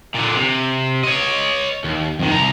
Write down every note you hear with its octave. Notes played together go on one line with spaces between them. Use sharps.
A#2 D3
C3
C#5 D#5
D#2
F2 D#3
C2 A#5